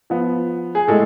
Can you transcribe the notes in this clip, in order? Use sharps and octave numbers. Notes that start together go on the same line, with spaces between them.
F3 B3
G#4
A2 G#3 A4